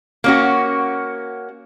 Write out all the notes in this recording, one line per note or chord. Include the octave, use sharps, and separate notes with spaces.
A#3 C#4 F#4